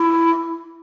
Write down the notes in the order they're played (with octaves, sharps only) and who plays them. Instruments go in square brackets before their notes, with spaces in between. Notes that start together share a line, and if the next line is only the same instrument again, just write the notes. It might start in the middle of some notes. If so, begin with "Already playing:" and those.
Already playing: [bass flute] E4